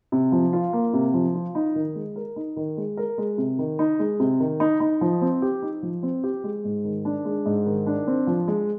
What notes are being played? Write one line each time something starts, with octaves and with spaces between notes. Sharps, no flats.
C3
F3
F4
A#3
C3
F3
F4
D#4
D#3
G#3
A#4
D#4
D#3
G#3
A#4
G#3
C3
D#3
D#4
G#3
C3
D#3
D#4
D#4
F3
C4
G4
D#4
F3
C4
G4
G#3
G#2
D#3
D4
G#3
G#2
D#3
D4
C4
F3
G#3